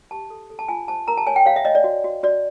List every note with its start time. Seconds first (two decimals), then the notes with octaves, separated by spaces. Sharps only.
0.11 G4 A5
0.30 A4
0.50 A4
0.59 A5
0.68 F4 G#5
0.88 C5 A5
1.08 A#4 A#5
1.17 A5
1.27 C#5 G#5
1.36 G5
1.45 C#5 F5
1.56 E5
1.65 C#5 D#5
1.75 D5
1.84 F#4
2.04 F#4
2.23 F#4 D5